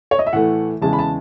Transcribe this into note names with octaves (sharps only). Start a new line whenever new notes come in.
C#5
D#5
E5
A2 E3 A3 F#5
E2 C#3 G#3 A5
B5
A5